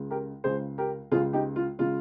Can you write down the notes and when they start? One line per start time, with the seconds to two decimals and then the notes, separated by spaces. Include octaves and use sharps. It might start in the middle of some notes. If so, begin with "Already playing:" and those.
Already playing: C#2 C#3 G#3
0.11 G4 A#4
0.44 C#2 C#3 G#3 G#4 C5
0.78 G4 A#4
1.12 C#2 C#3 G#3 F4 G#4
1.33 D#4 G4
1.56 F4
1.79 C#3 G#3 F4